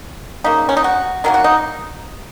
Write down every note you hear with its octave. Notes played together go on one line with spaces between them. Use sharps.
C#3 A#3 D#4
C#4
D#4
F#4
D#3 F#3 A#3 A#4
F#4
D#4